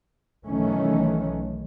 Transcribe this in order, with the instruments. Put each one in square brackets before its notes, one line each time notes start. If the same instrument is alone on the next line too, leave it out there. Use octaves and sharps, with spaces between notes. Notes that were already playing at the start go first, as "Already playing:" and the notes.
[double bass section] B1 D#3 E3 A3 C#4